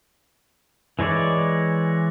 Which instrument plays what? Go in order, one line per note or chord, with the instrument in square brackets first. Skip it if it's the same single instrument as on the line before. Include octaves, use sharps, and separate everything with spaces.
[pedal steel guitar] E3 G#3 C#5 D5